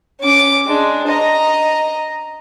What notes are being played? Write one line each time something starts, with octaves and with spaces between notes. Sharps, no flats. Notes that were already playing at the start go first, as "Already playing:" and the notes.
C#4 D6
G#3 D4
D#5 A#5